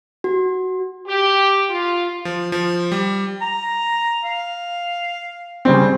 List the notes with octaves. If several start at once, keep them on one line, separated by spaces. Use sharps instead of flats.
F#4
G4
F4
F3
F3
G3
A#5
F5
C#3 G3 C4